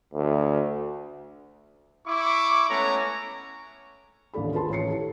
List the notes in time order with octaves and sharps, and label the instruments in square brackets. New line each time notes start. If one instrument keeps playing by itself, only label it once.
[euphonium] D2
[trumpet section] E4 C#6 D6
G#3 A3 B3 C#4 C#5 A#5
[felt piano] A1 D#2 A#3 D4 A4 B5
F4 G#4 A4 B4 A5 C6
A1 C#5 A#5 C7 C#7
E4 G4 A4